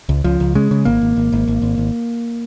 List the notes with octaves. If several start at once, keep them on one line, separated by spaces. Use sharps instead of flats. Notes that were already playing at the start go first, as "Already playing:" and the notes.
C#2
C#2 F3
C#2
C#3 G#3
C#3
G#1 A#3
G#1
G#1
G#1
G#1
G#1
G#1